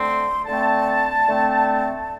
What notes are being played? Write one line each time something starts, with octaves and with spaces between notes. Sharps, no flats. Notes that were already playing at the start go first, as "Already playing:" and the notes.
Already playing: D3 A3 C4 C6
D3 A3 C4 A5
D3 A3 C4